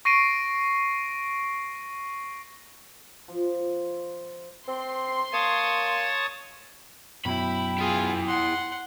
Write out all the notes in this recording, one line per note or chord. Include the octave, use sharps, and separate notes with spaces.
C#6 A#6 C7 D7 D#7
F3
C4 C6
A#3 C#5 A5 D#6
F#2 B2 E4 G5 B5
E4 F4 G#4 G#5
F#5 C6